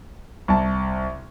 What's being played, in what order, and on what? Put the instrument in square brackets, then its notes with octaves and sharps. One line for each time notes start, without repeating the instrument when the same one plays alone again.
[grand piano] C2 A5